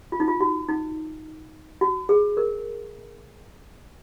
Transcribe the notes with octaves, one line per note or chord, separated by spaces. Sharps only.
F4
D#4
F4
F#4
D#4
F#4
G#4
A#4